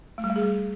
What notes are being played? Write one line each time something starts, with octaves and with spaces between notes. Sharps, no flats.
A3
G3
A3
G#4
G3